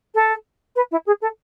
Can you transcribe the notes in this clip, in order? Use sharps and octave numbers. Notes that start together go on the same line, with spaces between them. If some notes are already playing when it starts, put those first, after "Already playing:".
A4
B4
E4
G#4
A4